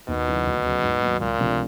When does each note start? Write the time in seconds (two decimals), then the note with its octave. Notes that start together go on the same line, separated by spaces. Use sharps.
0.08 D#2 B2
0.28 C#3 F#3 B3 E4
0.47 D2
0.65 C#3 F#3
0.83 G#2
1.02 D#3 F#3 A#3
1.21 C#2 A#2
1.39 C3 F3 A3 D4